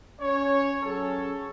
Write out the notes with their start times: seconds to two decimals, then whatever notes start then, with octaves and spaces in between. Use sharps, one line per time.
0.21 C#4 C#5
0.83 F#3 C#4 G#4 A4 C#5